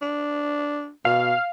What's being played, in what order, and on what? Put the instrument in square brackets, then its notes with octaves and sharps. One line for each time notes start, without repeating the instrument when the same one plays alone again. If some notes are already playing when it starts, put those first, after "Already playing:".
[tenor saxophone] D4
[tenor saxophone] B2 [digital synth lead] F5